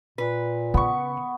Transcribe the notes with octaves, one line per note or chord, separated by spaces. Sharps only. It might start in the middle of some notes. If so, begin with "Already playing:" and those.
A#2 B4
C#3 B3 C#6